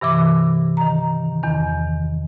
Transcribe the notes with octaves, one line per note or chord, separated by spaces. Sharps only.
G2 C3 E3 D6
D#3 A#5
E2 D#3